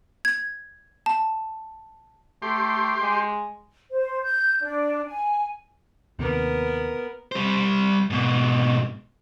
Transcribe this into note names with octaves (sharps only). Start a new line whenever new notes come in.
G#6
A5
A3 G4 C6
G#3
C5
G6
D4
G#5
D#2 C3 B3 A#4
G3 C5
G#2 B2